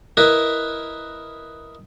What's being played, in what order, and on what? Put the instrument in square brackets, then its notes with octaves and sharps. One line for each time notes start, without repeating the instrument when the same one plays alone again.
[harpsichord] E4 A#4 B4 D#5